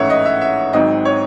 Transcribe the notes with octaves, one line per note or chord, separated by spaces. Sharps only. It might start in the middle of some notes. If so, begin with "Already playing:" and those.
Already playing: A1 G#2 E3 A3 C#4 C#5 E5 F#5
D#5
E5
E5
G#1 G#2 F#3 C4 D#5
C#5